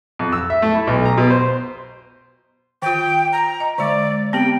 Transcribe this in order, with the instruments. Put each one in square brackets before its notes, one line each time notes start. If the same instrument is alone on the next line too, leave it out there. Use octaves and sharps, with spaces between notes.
[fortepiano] F2
E6
E5
A3
E4
B1
A#5
B2
C5
[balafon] D#3 F4 [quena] G5
[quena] A#5
[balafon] D#5
[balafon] D3 G#3 [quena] D5
[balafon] B3 C4 G4 [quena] G5